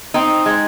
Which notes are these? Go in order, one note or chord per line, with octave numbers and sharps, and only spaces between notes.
C4 D#4
G#3